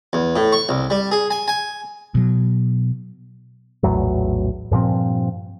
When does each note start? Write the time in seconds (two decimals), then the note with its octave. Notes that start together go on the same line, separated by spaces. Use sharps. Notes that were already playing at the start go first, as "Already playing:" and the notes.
0.13 E2
0.36 A2
0.53 C#6
0.69 C2
0.90 G3
1.12 G#4
1.31 G#5
1.48 G#5
2.15 B2 F#3
3.83 A#1 E2 A2 F#3
4.71 G2 A#2 F3 C4